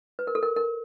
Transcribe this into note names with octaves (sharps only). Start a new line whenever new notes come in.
B4
A#4
A4
A#4
A#4